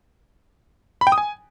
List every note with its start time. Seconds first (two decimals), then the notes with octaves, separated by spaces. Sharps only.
1.01 B5
1.07 G5
1.12 D#6
1.18 G#5